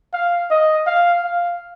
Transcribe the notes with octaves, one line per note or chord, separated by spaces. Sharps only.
F5
D#5
F5
F5